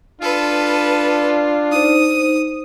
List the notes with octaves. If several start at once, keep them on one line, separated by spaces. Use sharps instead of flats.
D4 F4 A4 B4
D#4 C5 D#6